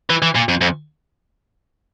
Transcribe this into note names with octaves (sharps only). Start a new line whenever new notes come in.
E3
E3
A#2
F2
F2